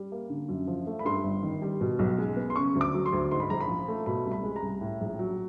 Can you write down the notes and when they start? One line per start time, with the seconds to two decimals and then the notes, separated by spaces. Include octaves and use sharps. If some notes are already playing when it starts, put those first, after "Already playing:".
Already playing: G3
0.12 A#3
0.30 D3
0.48 F#2
0.67 F3
0.86 A3
0.99 B5
1.05 G2 C6
1.24 G1
1.43 D#3
1.62 G3
1.81 B2
1.99 B1
2.18 G#3
2.37 B3
2.50 C6
2.56 C#3 C#6
2.75 D2
2.81 D6
2.94 F#3
3.06 C6
3.13 D2
3.31 G#2 C6
3.40 B5
3.50 A#1 A#5
3.60 B5
3.68 F3
3.88 A3
4.06 B2 B5
4.25 C2
4.32 B5
4.43 G#3
4.56 A#5
4.62 C2
4.81 A2
5.01 A#1
5.19 F#3